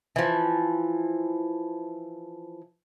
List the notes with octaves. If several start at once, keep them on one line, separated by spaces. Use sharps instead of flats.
E3 F3